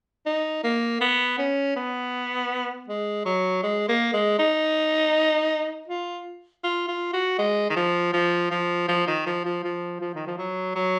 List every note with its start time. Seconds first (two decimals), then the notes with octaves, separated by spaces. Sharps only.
0.26 D#4
0.64 A#3
1.01 B3
1.38 C#4
1.76 B3
2.88 G#3
3.26 F#3
3.63 G#3
3.88 A#3
4.14 G#3
4.39 D#4
5.88 F4
6.63 F4
6.88 F4
7.13 F#4
7.38 G#3
7.70 D#3
7.76 F3
8.13 F3
8.51 F3
8.88 F3
9.07 D#3
9.26 F3
9.45 F3
9.64 F3
10.01 F3
10.15 D#3
10.27 F3
10.38 F#3
10.76 F#3